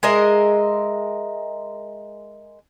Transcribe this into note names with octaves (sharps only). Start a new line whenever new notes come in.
G#3 A#4 D#5 E5